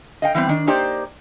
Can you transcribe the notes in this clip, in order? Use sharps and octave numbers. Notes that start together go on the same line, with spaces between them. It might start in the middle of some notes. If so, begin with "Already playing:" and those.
D#5 F5 G5
E3 G3 B3 C4
D#3 D4
A#3 D#4 G4 C5 D5